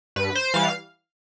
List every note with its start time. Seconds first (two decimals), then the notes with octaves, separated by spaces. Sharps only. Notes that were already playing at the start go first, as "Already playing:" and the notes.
0.16 G2 B4
0.35 C5
0.54 E3 G3 F5